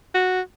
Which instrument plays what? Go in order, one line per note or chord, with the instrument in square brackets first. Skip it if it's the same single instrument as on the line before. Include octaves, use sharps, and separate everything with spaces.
[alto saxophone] F#4